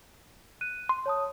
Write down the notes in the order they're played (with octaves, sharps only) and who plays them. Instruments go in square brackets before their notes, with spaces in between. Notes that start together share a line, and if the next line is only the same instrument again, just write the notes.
[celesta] F#6 D#7
[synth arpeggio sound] C6
[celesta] C#5 A5 D#6